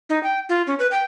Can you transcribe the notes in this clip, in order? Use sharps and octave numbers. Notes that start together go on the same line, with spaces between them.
D#4
G5
F4
C#4
B4
G5